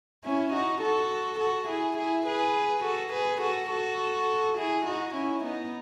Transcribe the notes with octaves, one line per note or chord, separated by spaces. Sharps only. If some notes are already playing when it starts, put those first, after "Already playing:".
C#4 E4
D#4 F#4
F#4 A4
F#4 A4
E4 G#4
E4 G#4
G#4 B4
F#4 A4
G#4 B4
F#4 A4
F#4 A4
E4 G#4
D#4 F#4
C#4 E4
B3 D#4